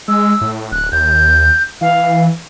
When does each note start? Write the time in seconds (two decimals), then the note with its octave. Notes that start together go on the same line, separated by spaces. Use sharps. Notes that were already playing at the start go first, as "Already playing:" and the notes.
0.08 G#3 E6
0.41 A2
0.72 D1 F#6
0.92 D#2 G6
1.81 E3 F5